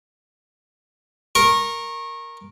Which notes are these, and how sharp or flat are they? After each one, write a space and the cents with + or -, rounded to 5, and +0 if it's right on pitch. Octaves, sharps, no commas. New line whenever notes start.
A#4 +0 C#6 -30